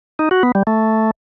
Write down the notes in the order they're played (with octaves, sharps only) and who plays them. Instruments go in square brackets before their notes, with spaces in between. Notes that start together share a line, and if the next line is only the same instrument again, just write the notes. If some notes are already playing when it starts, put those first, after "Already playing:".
[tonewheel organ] D#4
F#4
B3
G3
A3